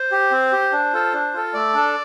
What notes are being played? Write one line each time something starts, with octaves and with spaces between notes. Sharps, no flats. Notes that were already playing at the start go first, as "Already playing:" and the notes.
Already playing: C5
G4
C4
G4
D4
F4 A4
D4
F4 A4
A3 D5
D4 A4